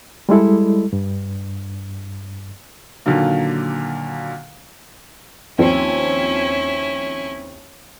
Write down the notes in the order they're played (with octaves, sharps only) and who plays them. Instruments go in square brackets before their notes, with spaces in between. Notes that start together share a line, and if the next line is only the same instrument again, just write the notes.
[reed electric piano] G3 G#3 E4 A4
G2
[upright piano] A#2 D3 D#3 F#3 A#3
[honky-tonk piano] D#2 F3 C4 [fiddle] C#4 E4